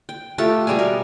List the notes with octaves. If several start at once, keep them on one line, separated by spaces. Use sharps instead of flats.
G5
A3 F4 G4 A4
B2 G3 G#4 G#5
A#4